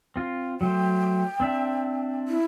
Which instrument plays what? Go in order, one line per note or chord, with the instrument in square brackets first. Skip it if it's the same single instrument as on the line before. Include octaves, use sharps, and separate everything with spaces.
[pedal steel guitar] C4 F4
[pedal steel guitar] F#3 A3 C5 [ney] G5
[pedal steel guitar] C4 D4 E5
[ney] E4